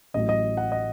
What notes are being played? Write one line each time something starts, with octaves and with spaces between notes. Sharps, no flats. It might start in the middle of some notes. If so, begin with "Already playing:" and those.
A1 A2 F#3 D#5
D#5
F#5
D#5